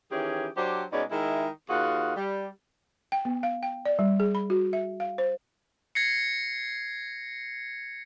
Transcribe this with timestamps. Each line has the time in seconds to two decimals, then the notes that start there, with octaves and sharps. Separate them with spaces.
0.12 D#3 E3 C#4 G4 G#4
0.57 F#3 D4 G4 C5
0.92 B2 G#3 C#4 D#4 D5
1.10 D#3 G#3 E4
1.69 D#2 F4 F#4 G#4 F#5
2.16 G3
3.12 G5
3.25 B3
3.43 F5
3.63 G5
3.86 D5
3.99 G3
4.20 G#4
4.35 B5
4.50 F#4
4.73 E5
5.00 F5
5.18 C5
5.95 G#6 A#6 C7 C#7